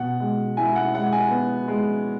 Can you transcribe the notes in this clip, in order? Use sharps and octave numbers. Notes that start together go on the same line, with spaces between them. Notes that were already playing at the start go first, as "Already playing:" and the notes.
Already playing: B2 F#5
G#3
E4 G#5
F#5
G#3 F#5
G#5
B3
G#3